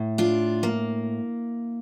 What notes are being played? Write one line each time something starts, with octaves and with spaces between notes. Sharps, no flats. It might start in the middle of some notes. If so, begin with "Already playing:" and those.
Already playing: A2
D4 F4
A#3